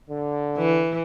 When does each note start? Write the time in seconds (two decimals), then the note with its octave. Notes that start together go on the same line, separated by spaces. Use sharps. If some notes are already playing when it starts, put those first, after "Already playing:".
0.10 D3
0.57 E3